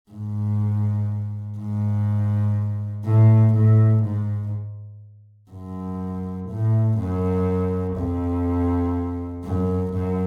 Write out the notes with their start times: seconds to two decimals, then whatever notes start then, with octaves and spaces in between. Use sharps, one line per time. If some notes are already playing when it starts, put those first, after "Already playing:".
0.11 G#2
1.58 G#2
3.05 A2
3.54 A2
4.04 G#2
5.51 F#2
6.50 A2
6.99 F#2
7.97 F2
9.44 F#2
9.94 F#2